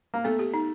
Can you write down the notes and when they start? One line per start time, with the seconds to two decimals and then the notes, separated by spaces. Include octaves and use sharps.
0.14 A#3
0.24 A3 B3
0.39 G4
0.54 D#4